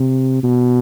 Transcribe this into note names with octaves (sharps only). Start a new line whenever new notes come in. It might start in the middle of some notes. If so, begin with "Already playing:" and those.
Already playing: C3
B2